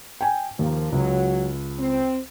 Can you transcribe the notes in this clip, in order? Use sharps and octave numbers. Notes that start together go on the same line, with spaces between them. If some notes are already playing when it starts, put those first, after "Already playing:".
G5 G#5
D#2 F3 A#3
C#2 F#3
C4